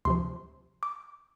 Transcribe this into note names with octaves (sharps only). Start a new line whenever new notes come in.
D2 C3 F3 C6
D6